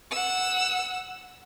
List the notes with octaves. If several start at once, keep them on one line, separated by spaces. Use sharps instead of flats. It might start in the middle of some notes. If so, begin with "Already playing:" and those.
F#5 E6